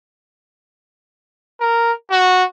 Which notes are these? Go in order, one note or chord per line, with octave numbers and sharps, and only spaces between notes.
A#4
F#4